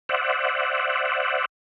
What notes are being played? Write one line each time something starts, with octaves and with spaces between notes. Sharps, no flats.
C5 D5 E5 F#5